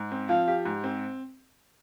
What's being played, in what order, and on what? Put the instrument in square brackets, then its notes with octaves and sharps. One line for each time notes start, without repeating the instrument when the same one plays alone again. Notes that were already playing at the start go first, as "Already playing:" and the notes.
Already playing: [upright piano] G#2
C4
[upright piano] F3 [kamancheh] F5
[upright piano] G4
G#2
C4